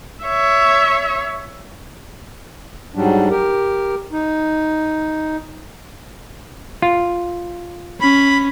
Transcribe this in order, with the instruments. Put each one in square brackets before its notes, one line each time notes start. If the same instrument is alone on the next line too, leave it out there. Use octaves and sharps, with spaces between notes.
[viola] C#5 E5
[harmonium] G#2 F#3 G3 D4
G4 A#4
D#4
[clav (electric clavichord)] F4
[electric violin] C#4 [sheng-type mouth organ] B5